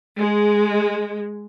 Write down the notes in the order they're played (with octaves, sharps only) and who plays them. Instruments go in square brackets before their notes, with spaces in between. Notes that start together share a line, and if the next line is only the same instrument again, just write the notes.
[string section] G#3